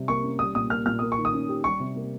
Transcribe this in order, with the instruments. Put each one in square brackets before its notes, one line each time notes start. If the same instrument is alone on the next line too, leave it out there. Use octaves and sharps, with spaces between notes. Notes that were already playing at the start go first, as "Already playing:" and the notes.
Already playing: [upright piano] C3 G3
[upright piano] A#3 [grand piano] C#6
[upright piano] C#4
[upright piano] G3 [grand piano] D#6
[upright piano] A#2 [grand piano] D#6
[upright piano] A#3 [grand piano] F6
[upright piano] A#2 [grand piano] F6
[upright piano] A#3 [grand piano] D#6
[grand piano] C#6
[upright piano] D#3
[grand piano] D#6
[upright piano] C#4
G4
[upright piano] G3 [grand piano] C#6
[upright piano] C3
A#3